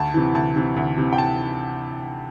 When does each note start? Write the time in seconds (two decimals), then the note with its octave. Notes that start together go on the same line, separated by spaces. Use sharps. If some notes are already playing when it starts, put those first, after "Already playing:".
Already playing: D2 A5
0.14 C3 E3
0.35 D2 A5
0.56 C3 E3
0.76 D2
0.98 C3 E3
1.13 G5
1.18 A5